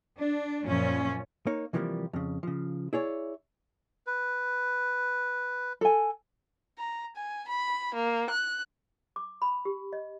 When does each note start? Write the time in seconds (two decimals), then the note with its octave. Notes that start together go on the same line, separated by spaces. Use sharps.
0.17 D4
0.65 F#2 A#2 F3 C#4
1.47 A#3 D#4 C#5
1.73 C3 E3 F3 G3 A3 A#3
2.13 F2 C#3
2.43 C#3 F3
2.93 E4 G#4 C#5 D5
4.07 B4
5.81 A4 G#5
6.78 A#5
7.16 G#5
7.48 B5
7.95 A#3
8.30 F#6
9.16 D6
9.42 B5
9.65 G4
9.93 D#5